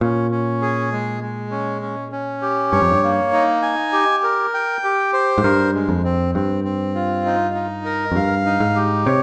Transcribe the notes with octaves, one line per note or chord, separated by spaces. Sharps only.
A#2 C#4
C#4
G#4
G#3
G#3
C#4
C#4
C#4
G4
G2 C#5
F2
G2
A#3
D#4
G#5
G4
A#4
G5
G4
C5
G#2
G2 A#4
G#3
F2
C4
G2 C4
C4
F4
D#4
D#4
A#4
F2
G2 F5
D#4
G#2
G4
C3 C#5